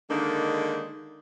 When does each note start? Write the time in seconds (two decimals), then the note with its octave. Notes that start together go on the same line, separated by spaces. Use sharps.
0.09 D3 D#3 G#3 A#3 D4 D#4